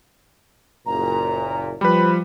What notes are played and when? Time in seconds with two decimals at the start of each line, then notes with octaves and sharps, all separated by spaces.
0.86 F#1 A#2 A#5
1.81 F3 G3 B4 B5